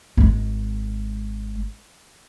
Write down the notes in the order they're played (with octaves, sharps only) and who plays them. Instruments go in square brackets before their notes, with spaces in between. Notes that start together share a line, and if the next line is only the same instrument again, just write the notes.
[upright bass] G#1 G#3